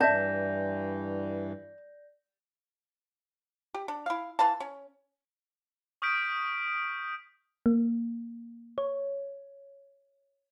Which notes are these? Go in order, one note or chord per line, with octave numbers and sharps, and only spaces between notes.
G2 E3 D5 E5 A5 G6 A#6
G4
D4
E4 F5
E3 B4 F5 A5
C#4
C#6 D#6 F6 G6 B6 D7
A#3
C#5